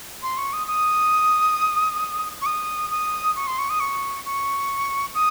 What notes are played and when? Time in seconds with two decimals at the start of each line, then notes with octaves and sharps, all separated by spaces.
0.22 C6
0.37 C#6
0.53 D#6
0.67 D#6
2.42 C#6
2.46 D#6
2.91 D#6
3.36 C#6
3.47 C6
3.59 C#6
3.70 D#6
3.80 C#6
4.25 C#6
5.15 D#6